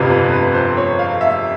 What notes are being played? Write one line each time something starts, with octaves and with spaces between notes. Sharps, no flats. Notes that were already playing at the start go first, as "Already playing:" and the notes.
Already playing: G1 F2 C3 F3 B4
B4
B4
C5
C#5
F5
E5